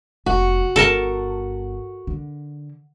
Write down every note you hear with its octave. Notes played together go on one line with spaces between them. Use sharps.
F1 F#4
G1 A4 A#4 A5
D3